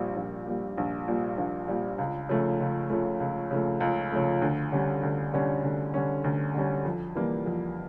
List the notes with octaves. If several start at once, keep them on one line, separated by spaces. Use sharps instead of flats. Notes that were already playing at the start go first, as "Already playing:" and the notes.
Already playing: A#1 A#2 G3
A#1
A#2 G3
A#1
A#2 G3
A#1
A#2 G3
C#2
C#3 F3 A3
C#2
C#3 F3 A3
C#2
C#3 F3 A3
C#2
C#3 F3 A3
D2
D3 G3 C#4
D2
D3 G3 C#4
D2
D3 G3 C#4
D2
D3 G3 C#4
F2
E3 G3 A#3
F2